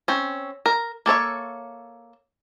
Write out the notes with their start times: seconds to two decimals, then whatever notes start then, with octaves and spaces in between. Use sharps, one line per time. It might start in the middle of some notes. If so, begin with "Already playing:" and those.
0.08 C4 C#4
0.66 A#4
1.06 A#3 A4 C#5 E5